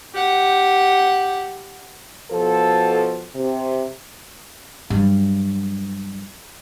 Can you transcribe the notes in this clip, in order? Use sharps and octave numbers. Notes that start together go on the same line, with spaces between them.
G4 F#5
B2 F3 A4
C3
G2 F#3